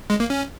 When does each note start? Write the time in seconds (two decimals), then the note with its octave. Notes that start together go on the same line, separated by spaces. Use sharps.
0.10 G#3
0.20 A#3
0.30 C#4